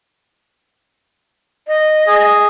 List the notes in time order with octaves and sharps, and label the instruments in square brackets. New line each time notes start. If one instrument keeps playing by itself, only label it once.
[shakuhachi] D#5
[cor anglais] G#4